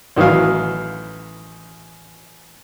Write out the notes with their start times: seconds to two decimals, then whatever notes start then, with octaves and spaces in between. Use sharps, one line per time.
0.16 A1 D#3 E3 F#3 F5